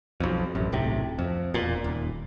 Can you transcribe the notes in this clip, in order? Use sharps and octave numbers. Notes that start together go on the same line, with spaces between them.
B1 F2
A1 F#2
D1 B1 A2 C3
F2
E1 A#2
D#1